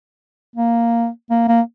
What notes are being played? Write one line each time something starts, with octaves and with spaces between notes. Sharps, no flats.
A#3
A#3
A#3